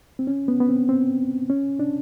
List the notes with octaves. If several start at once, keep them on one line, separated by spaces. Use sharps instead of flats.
C4
C#4
B3
B3
C4
C4
C#4
D4